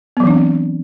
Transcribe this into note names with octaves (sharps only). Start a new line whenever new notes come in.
E3 F#3 B3 C4 D4